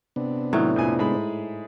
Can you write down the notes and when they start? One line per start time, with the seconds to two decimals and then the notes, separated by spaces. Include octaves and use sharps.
0.16 C3 B3 D4
0.53 A2 D#3 F#3
0.76 F2 A#2 G#5
0.99 G#2 G#4 B5